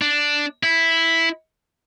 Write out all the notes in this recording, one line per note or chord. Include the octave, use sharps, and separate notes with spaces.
D4
E4